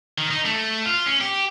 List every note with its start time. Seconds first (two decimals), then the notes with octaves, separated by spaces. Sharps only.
0.18 D#3
0.31 D#4
0.45 A3
0.85 F4
1.06 C#4
1.21 G4